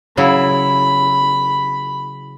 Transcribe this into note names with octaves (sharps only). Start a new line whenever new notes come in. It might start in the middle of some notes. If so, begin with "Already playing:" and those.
C#3 F#3 E4 B5